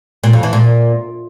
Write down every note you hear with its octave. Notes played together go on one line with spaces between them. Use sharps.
A#2
F2
E3
A#2